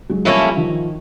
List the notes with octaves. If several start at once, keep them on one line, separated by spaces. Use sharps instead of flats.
F#3 G#3
F3 G3 A#3 C#4 E4 A4
D#3 F3